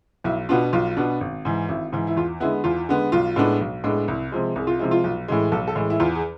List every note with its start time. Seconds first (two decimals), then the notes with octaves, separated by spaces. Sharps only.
0.24 B1 E4
0.49 B2 B3 D4 F4
0.73 B1 F4
0.97 B2 B3 D4
1.21 G#1
1.45 G#2 E3
1.69 G#1 E4
1.92 G#2 E3
2.07 E4
2.16 E2 F4
2.40 D3 G#3 B3 E4
2.64 E2 F4
2.89 D3 G#3 B3
3.12 B1 F4
3.36 A2 G#3 B3 D4
3.60 B1
3.84 A2 G#3 B3 D4
4.08 C2 E4
4.32 C3 F3 G#3
4.56 C2 G#4
4.67 F4
4.79 C3 F3 G#3 E4
4.91 F4
5.04 B1
5.28 A2 E3 G#3
5.52 B1 A4
5.68 A4
5.75 A2 E3 G#3
5.90 E4
6.00 E2 F4
6.15 G#4